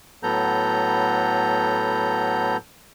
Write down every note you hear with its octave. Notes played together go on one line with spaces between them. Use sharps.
A2 F#3 B3 A4 A#5 G6